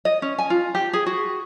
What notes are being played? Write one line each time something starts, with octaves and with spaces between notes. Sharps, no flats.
D#5
C#4
G#5
F4
G4
G#4
F#4